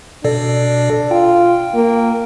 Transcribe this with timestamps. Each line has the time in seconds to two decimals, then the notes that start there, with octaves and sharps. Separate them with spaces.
0.24 B2 D4 A4 D5
1.11 F4 G5
1.74 A#3